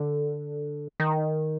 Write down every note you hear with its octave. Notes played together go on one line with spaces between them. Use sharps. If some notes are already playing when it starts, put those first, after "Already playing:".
Already playing: D3
D#3